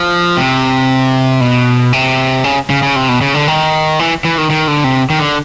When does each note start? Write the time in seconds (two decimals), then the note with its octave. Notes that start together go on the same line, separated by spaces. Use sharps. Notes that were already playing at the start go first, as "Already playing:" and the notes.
Already playing: F3
0.37 C3
1.41 B2
1.93 C3
2.44 C#3
2.70 C#3
2.83 C#3
2.96 C3
3.09 B2
3.21 C#3
3.34 D3
3.48 D#3
3.99 E3
4.25 E3
4.38 D#3
4.50 D#3
4.68 D3
4.84 C3
5.10 D#3
5.19 D3